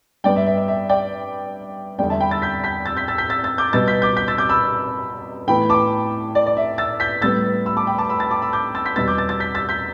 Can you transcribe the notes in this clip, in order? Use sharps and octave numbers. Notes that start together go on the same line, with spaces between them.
G2 G3 B3 D5 G5
E5
E5
E5
E5
D5 G5
E2 D3 G3 D5 G5
E5 A5
G5 B5
E6 A6
G6 B6
G6 B6
E6 A6
G6 B6
E6 A6
G6 B6
E6 A6
E6 A6
D6 G6
B2 G3 B3 E6 A6
G6 B6
D6 G6
G6 B6
E6 A6
D6 G6
B5 E6
A2 E3 B3 G5 B5
A5 D6
D5
D5
E5
E6 A6
G6 B6
A2 G3 B3 E6 A6
B5 E6
A5 D6
G5 B5
A5 D6
B5 E6
E6 A6
A5 D6
B5 E6
D6 G6
E6 A6
G6 B6
E2 B2 G3 B3 E6 A6
D6 G6
E6 A6
E6 A6
G6 B6
E6 A6
G6 B6